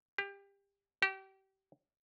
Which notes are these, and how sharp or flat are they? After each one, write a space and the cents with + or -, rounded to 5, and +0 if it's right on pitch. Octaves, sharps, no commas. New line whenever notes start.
G4 +25
G4 -30